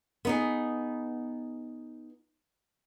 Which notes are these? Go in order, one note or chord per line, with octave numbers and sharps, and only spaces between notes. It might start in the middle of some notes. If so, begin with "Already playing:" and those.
B3 D#4 G#4